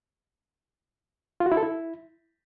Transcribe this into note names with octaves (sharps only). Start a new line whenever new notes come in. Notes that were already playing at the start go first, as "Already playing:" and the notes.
F4
F#4
E4
A4
E4